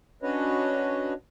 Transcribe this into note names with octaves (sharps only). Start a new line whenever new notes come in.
C#4 D4 F#4 B4 C#5 D#5